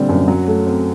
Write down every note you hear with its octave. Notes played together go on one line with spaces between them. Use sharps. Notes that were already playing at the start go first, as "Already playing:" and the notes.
Already playing: A#2 D3 G3 C4
F#2
F#3
A3
C4